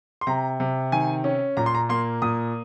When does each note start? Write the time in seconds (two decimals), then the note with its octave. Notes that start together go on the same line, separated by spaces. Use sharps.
0.21 C6
0.27 C3 A#5
0.60 C3
0.92 D#3 G#5
1.24 C#4
1.57 A#2 A#5
1.66 C6
1.75 A#5
1.89 A#3 C6
2.22 A#2 D#6